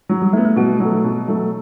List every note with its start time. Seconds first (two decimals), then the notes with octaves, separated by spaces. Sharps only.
0.09 F#3
0.22 G3
0.33 A3 E4
0.37 B3
0.45 A3
0.56 B2 F#4
0.80 F#3 A3
1.04 B2
1.28 F#3 A3